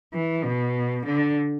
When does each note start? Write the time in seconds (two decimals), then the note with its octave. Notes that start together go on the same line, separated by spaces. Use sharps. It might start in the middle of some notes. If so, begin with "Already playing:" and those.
0.13 E3
0.45 B2
1.06 D3